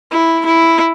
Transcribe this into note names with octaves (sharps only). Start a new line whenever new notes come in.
E4
E4